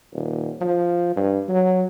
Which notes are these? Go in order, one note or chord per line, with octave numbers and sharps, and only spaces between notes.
D#1
F3
G2
F#3